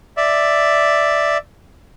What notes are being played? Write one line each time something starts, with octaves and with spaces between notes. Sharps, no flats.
D5 E5